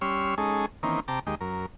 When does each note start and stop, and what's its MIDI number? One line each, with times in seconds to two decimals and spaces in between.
0.01 0.35 55
0.01 0.35 61
0.01 0.35 73
0.01 0.35 84
0.01 0.35 88
0.01 0.35 89
0.38 0.66 56
0.38 0.66 61
0.38 0.66 63
0.38 0.66 68
0.38 0.66 69
0.83 1.00 51
0.83 1.00 52
0.83 1.00 58
0.83 1.00 60
0.83 1.00 61
0.83 1.00 63
1.08 1.19 48
1.08 1.19 79
1.08 1.19 81
1.08 1.19 82
1.08 1.19 86
1.27 1.35 39
1.27 1.35 56
1.27 1.35 67
1.27 1.35 75
1.41 1.66 42
1.41 1.66 70